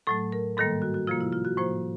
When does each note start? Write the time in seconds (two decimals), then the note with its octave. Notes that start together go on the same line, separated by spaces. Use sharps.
0.07 A2 F#3 A3 A4
0.32 A#4
0.57 G#2 D#3 G3 A#3 A4
0.82 F#4
0.94 F#4
1.07 C3 F3 A#3 F4
1.21 E4
1.33 F4
1.45 F#4
1.57 A2 F3 A#3 C5